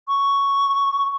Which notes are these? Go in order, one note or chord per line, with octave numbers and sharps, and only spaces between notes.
C#6